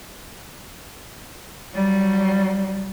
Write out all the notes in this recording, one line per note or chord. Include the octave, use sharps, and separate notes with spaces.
F#3 G3